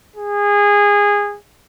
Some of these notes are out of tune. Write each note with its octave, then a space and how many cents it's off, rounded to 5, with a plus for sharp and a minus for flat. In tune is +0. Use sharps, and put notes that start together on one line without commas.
G#4 -20